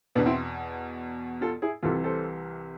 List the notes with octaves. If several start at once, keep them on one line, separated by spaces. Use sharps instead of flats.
E2 B2 B3 D4
C4 E4
F4 A4
E4 G#4
C2 C3 E3 F4 A4
A4 C5